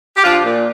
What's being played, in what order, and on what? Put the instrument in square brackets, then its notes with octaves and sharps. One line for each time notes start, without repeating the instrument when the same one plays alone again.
[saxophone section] G4
F3 D4 F4
A#2